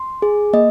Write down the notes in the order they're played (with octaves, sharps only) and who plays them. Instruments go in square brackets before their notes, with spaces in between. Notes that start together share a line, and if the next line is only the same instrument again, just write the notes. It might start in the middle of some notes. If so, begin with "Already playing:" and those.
Already playing: [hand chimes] C6
G#4
A#3 D#5